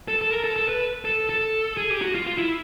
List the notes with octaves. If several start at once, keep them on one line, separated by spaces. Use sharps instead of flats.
A4
A4
A#4
A4
A4
B4
A4
A4
G#4
G4
F#4
F4
F4
E4